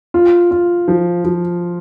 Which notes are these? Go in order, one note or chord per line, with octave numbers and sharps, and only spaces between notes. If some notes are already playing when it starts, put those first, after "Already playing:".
F4
F4
F3
F3